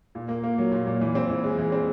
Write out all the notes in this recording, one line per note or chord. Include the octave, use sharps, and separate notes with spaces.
A#2
A#3
A#3
F#3
A#2
A#2
E3
C4
E3
G#3
E3
C4